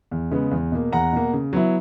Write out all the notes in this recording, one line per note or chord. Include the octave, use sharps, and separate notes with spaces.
E2
C#3 G#3 B3
E2
B2 A#3
E2 F#5 A#5
B2 A#3
C#3
F#3 B3 E4